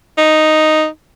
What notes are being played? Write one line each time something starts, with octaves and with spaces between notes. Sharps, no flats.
D#4